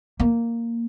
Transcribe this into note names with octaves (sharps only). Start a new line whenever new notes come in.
A#3